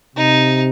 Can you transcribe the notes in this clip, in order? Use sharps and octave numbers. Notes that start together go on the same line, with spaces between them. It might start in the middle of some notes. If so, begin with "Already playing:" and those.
C3 D#4